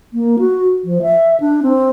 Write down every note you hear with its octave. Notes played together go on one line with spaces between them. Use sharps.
A#3
F#4
F3
E5
D4
C4